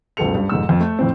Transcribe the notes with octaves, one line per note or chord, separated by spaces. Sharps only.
F#1 C#2 B2 A4 C#7 F7
G2
F1 G#2 E6
F2
A3
F2 A2 C4